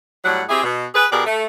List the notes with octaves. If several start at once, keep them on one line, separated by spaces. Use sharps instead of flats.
A2 F#3 G3 F#5
C4 E4 G4 G#4
B2
G#4 B4
B2 G4 G#4 A#4 D5
A3